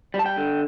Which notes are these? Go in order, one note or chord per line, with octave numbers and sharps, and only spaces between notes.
G3
A5
G5
D3